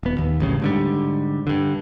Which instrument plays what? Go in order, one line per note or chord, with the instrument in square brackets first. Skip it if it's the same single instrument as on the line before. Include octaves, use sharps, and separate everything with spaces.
[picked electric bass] D#1 B3
D#2
A1 D2 G2 C#3
G#2 D3 G3
G2 D3